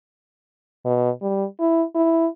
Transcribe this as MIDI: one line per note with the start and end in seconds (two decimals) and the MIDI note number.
0.85 1.10 47
1.22 1.45 55
1.60 1.83 64
1.95 2.26 64